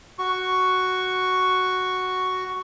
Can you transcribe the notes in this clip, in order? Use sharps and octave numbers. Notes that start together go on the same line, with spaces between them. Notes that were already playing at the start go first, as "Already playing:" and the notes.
F#4 C#6